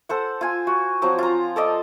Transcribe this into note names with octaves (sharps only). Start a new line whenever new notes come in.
A4 C5 F#5
F4 G#5
F#4
F3 F#3 C4
F4 A#5
A4 D5 D#5